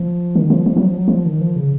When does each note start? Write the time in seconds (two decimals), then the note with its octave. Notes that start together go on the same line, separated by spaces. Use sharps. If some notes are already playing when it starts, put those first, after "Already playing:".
Already playing: F3
0.35 D#3
0.50 F3
0.66 F3
0.77 F#3
0.86 F3
0.98 F#3
1.08 F3
1.26 D#3
1.41 F3
1.56 C#3